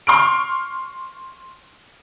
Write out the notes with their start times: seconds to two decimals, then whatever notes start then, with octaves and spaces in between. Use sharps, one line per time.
0.07 C6 C#6 F6 D7